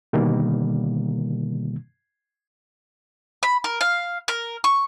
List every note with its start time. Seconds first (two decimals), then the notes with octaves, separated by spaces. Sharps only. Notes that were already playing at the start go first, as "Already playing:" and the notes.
0.13 B2 D3 D#3 G3 A#3
3.43 B5
3.64 A#4
3.81 F5
4.28 A#4
4.64 C#6